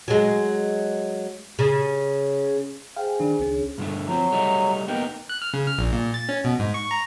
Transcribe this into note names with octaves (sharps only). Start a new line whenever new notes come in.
F#3 G#3
C#3
G#4 C5 F5 G5 G#5
D#3 D4
C#2 C#4 D4 G#4 C#5
G2 D3 A3
F3 F#3 C4
G3 A3 D#4
A#3 B3 D#4 G5
F#6
F6
C#3
F6
A#1
A#2
A6
C#4
B2
G#2
C#6
A#5